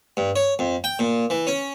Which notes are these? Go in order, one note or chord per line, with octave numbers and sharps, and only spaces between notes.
G2
C#5
F2
G5
A#2
E3
C#4